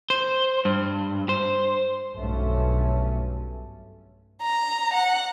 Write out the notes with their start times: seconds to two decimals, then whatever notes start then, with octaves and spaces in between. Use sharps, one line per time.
0.10 C5
0.65 G2
1.29 C5
2.17 B1 G2 A3 C#4
4.42 A#5
4.93 F#5